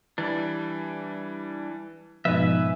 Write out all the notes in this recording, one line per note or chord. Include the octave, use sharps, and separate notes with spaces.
E3 G3 D4
G#2 B2 F3 B4 E5 G#5